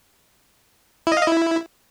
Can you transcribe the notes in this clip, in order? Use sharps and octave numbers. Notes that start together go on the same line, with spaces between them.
E4
D#5
F5
D#5
E4